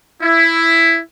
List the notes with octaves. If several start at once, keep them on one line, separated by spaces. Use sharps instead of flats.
E4